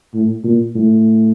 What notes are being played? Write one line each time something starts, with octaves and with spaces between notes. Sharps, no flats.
A2
A#2
A2